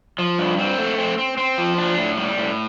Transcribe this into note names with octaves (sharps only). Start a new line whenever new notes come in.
F3
G2
C4
A3
C4
C4
C4
F3
D4
A2
G3
A2